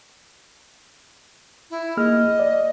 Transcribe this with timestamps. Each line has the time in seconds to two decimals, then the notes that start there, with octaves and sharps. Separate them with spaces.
1.70 E4
1.97 A#3 G#4 D#5 F6
2.40 D5